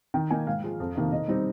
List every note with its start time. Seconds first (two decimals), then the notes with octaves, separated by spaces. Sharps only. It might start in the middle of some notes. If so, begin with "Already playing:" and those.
0.14 D#3 G5
0.30 A#3 D#4 G#5
0.47 G#2 F5
0.63 F3 G#3
0.80 F2
0.95 C3 D#3 A#3
1.11 D#3 D#5
1.28 G3 C4 D#4